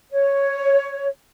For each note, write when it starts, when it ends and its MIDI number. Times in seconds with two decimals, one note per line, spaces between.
0.11 1.07 73